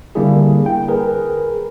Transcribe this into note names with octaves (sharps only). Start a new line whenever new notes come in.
D3 G3 A#3 D4 E4 G#4
G5
G#4 A#4 B4